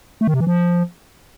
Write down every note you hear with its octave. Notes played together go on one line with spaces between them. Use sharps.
A3
D#3
C3
E3
F3